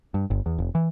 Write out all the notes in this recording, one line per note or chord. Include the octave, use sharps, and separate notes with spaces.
G2
G1
E2
F1
E3